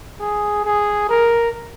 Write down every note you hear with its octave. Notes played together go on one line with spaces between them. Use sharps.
G#4
G#4
A#4